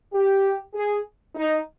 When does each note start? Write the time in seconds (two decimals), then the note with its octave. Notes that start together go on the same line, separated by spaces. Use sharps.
0.14 G4
0.75 G#4
1.35 D#4